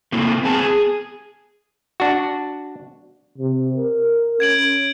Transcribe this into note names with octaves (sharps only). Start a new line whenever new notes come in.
A3 A#3 C4 E4
B3 C4 G#4 A5
G#4
D4 F#4
C3
A#4
C#4 G#6 D7 F#7